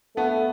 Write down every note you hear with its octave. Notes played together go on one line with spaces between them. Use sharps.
A3 B3